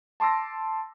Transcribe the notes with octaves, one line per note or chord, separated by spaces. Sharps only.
A5 C6 D6 E6 A#6